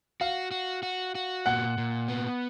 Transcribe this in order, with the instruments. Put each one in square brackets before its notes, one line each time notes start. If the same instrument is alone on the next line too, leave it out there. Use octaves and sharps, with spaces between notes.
[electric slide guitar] F#4 [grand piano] F5
[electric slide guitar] F#4
F#4
F#4
[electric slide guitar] A#2 [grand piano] F#5
[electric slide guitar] A#2
B3